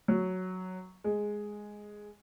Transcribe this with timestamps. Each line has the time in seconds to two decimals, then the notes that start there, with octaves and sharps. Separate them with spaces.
0.08 F#3
1.04 G#3